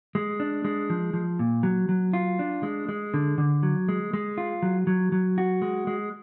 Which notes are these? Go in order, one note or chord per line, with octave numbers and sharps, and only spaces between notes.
G#3
D4
G#3
F3
F3
A#2
F#3
F#3
F4
D4
G#3
G#3
D3
D3
F#3
G#3
G#3
F4
F#3
F#3
F#3
F#4
G#3
G#3